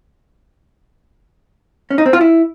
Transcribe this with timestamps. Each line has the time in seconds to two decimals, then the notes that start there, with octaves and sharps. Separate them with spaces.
1.91 C#4
1.98 D#4
2.06 C4
2.13 F4
2.21 E4